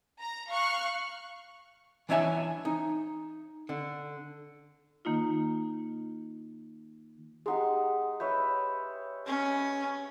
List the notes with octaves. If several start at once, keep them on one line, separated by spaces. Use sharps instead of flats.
A#5
F5 C#6 F6 F#6
E3 D4 C#5 E5 G#5
D#4
D3
D#3 A#3 D#4 F4
G#3 D#4 G4 G#4 F#5
B4 C#5 E5 G6
C#4